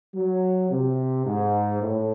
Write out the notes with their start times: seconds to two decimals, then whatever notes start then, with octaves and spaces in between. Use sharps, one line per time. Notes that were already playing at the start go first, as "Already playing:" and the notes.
0.15 F#3
0.70 C3
1.26 G#2
1.81 A2